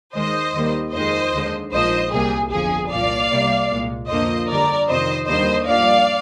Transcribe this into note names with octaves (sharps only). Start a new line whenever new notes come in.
D#2 D#3 G#3 C5 D#5
D#2 D#3 G3 A#3
F2 D#3 G#3 C5 D#5
D#2 D3 G#3
A#1 G#2 F3 A#3 C5 D#5
C2 C3 G3 A#3 G#4
G1 F2 D3 F3 G#4
C2 A#2 F3 A#3 D5 F5
C2 C3 G3 A#3
C2 A#2 G#3
F2 D3 F3 A#3 C5 D#5
G2 D3 G3 A#4 D5
F2 C3 D#3 C5 D#5
D#2 D3 G3 A#3 C5 D#5
G2 F3 A#3 D5 F5